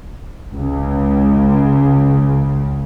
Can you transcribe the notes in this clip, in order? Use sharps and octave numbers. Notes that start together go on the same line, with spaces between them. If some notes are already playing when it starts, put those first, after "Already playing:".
C#2 C#3